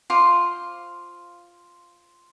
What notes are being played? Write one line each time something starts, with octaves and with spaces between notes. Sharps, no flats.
F4 C5 C6 D6